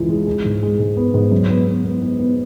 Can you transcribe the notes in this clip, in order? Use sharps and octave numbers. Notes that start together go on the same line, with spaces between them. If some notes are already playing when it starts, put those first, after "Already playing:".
Already playing: C#2 C#3 E3
G#3
G#3
G#2
G#3
G#2
B3
G#2
F#2
B3
B3
B3
B3
B3